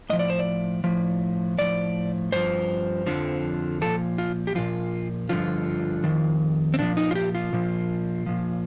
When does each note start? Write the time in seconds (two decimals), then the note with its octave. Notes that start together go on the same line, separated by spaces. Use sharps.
0.10 A2 F3 D#5
0.19 D5
0.30 C5
0.39 D5
0.84 A2 F3
1.58 A2 F3 D5
2.32 G2 F3 C5
3.06 F2 D3 F3
3.81 A#2 F3 A4
4.18 F4
4.47 G4
4.55 A#2 F3 F4
5.29 G2 D3 F3 F4
6.04 F2 D#3
6.74 C4
6.79 A#2 F3 D4
6.97 D#4
7.11 F4
7.15 G4
7.35 F4
7.53 A#2 F3
8.26 A#2 F3